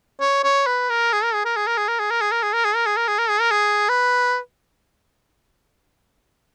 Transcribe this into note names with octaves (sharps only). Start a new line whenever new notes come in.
C#5
C#5
B4
A#4
G#4
A#4
G#4
A#4
G#4
A#4
G#4
A#4
G#4
A#4
G#4
A#4
G#4
A#4
G#4
A#4
G#4
A#4
G#4
A#4
G#4
A#4
G#4
B4